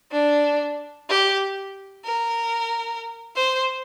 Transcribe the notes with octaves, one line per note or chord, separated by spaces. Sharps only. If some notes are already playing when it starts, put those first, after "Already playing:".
D4
G4
A#4
C5